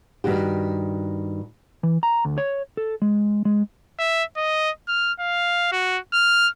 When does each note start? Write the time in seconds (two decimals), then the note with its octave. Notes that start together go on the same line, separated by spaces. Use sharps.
0.24 G2 D#3 F#4 G4
1.83 E3
2.03 A#5
2.25 D2
2.38 C#5
2.77 A4
3.02 G#3
3.45 G#3
3.99 E5
4.37 D#5
4.88 F6
5.20 F5
5.72 F#4
6.13 F6